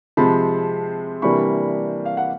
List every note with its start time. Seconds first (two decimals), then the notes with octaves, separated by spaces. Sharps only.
0.17 C3 F3 G#3 C4 A5 B5
1.22 C3 E3 G3 A#3 D4 B5 C#6
2.06 F5
2.17 F#5